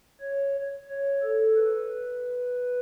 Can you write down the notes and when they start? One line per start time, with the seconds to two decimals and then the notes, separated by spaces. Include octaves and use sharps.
0.21 C#5
0.89 C#5
1.23 A4
1.57 B4